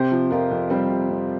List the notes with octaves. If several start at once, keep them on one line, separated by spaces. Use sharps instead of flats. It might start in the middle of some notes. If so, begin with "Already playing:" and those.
Already playing: C3 G4 C5
F3
F2 F4 A#4
F2
C3 G3 C4
C3
F2